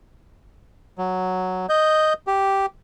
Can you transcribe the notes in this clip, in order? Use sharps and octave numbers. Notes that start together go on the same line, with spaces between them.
F#3
D#5 G6
G4